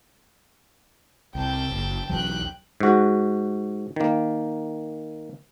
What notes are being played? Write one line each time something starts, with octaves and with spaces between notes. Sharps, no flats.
C2 G5 A5
F#1
B1 E2 F#3 G5 F#6
G#2 F#4
D#3 A#3